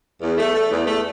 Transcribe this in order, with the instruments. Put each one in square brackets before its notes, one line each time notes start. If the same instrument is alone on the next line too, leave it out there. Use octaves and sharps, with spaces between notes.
[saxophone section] E2
A3
A3
E2
A3